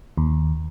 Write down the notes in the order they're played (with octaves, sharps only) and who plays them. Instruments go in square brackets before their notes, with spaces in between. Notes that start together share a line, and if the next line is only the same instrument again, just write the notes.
[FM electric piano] D#2